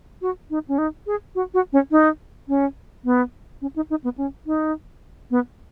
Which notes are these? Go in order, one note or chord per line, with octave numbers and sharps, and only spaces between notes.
F#4
D#4
C#4
D#4
G#4
F#4
F#4
C#4
D#4
C#4
B3
C#4
D#4
D#4
B3
C#4
D#4
B3